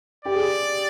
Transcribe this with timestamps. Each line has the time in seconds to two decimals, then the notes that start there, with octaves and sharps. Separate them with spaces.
0.25 G4 D5
0.34 G#4